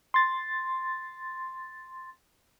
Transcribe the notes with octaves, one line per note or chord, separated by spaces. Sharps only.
C6 A6